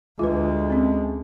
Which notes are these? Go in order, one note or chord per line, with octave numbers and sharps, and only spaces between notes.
D2 G#3 F4 B4
C4 C#4